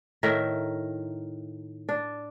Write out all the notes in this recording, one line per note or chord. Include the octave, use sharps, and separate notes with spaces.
A2 D#3 A#4 E5
D4